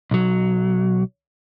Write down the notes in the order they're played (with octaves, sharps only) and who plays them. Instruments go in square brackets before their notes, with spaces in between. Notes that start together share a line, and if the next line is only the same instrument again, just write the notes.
[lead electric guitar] B1 F#3